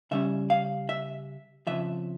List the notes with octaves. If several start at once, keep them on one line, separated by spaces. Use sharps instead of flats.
C#3 G3 C#4 E5
F5
E5
F2 C#3 F3 E5